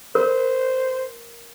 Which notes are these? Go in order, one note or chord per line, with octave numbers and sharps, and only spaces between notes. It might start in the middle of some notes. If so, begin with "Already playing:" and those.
A#4 C5